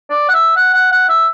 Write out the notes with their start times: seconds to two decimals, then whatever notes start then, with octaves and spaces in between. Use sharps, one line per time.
0.10 D5
0.29 F#5
0.34 E5
0.56 F#5
0.74 F#5
0.92 F#5
1.09 E5